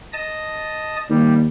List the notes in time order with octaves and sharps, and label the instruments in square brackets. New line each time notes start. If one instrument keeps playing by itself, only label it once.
[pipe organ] D#5 A5 D#6
[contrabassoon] D#2 [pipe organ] G3